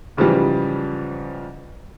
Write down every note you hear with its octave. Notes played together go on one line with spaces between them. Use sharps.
G#2 C#3 E3 F3 G3